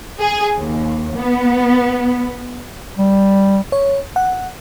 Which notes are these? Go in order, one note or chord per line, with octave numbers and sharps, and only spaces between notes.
G#4
D#2
B3
G3
C#5
F#5